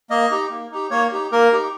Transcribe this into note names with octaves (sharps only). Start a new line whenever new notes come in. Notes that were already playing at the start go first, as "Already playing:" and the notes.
A#3 D#5
D#4 G4
A#3
D#4 G4
A#3 C#5
D#4 G4
A#3 A#4
D#4 G4